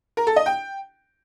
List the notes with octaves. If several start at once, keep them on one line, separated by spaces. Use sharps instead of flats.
A#4
A4
D#5
G5